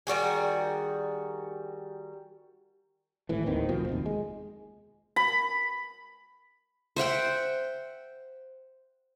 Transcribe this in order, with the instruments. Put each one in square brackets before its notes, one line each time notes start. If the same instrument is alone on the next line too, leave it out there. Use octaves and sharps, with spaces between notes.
[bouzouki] D#3 G3 F#4 G#4
[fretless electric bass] G#1 A2 E3
D1 D#2 D#3 C4
D2 B2 F3 C4
F1 D#2
G#3
[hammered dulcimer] B5
[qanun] C5 E5 F#5 G5